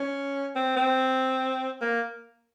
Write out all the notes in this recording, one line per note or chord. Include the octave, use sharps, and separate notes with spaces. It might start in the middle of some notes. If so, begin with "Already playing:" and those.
Already playing: C#4
C4
C4
A#3